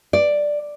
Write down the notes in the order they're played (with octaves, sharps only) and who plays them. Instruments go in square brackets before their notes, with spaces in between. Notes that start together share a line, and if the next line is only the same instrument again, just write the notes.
[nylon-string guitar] D5